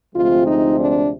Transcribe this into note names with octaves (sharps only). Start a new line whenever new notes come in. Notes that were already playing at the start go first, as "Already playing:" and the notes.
D2 C3 F3 G#3 C4 F4
D#4
D4